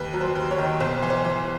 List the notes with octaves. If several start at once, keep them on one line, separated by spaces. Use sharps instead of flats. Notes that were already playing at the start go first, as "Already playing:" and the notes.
Already playing: D#2 B4
F#3
C5
D#2
C#5
D#3
B1 C5
E3
C5
E3